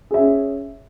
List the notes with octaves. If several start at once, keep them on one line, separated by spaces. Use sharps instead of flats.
C#4 G#4 E5